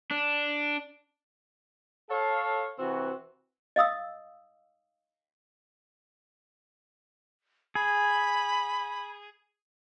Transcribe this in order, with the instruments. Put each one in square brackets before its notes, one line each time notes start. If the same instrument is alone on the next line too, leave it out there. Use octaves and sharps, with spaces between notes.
[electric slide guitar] D4
[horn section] A4 C#5 F5
C3 E3 C4 F#4
[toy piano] D#5 F5 D#6 E6
[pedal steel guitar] G#4 [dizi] B5